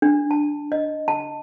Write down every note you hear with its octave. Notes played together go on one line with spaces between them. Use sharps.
D4
A5
D#5
A5